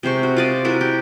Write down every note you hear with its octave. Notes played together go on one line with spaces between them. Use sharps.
C3 G#3 C5 C#6
F#4 C5
F4 D5 D#5
G#3 E4 F#4 A#4
G4